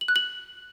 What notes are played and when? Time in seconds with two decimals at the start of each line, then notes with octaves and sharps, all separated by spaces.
0.01 F#7
0.08 F#6
0.16 F#7